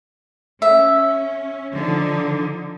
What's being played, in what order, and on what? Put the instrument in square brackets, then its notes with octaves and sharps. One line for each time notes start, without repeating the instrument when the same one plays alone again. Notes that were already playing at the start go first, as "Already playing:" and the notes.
[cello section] C#4 [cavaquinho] E5
[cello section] D3 F3 D#4